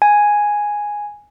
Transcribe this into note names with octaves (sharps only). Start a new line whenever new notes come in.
G#5